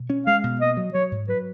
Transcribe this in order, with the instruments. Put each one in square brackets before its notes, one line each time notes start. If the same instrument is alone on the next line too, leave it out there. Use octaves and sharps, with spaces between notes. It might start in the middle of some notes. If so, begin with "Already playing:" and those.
Already playing: [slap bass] B2
C#4
[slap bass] G#3 [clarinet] F5
[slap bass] B2
[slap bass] A#3 [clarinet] D#5
[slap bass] F#3
[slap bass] F#3 [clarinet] C#5
[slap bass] G#2
[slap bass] F#3 [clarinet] B4